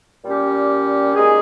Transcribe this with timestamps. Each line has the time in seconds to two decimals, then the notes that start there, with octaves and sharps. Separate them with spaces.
0.24 A#2 G3 C#4 G4
1.15 A#2 G#3 D#4 G#4